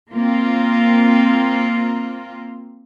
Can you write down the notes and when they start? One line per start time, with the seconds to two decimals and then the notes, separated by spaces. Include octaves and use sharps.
0.13 A#3 C4 F4